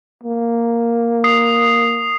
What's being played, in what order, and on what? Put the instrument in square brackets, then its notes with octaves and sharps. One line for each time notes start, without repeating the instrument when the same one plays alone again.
[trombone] A#3
[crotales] D#6 C7